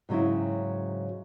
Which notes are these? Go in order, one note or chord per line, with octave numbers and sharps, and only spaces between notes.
G#2 C#3 F#3 C4 E4